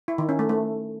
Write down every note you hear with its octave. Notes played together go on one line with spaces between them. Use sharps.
E4
D#3
C#4
A3
A3